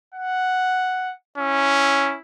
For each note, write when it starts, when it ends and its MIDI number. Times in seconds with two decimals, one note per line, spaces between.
0.14 1.12 78
1.38 2.16 61
1.38 2.22 64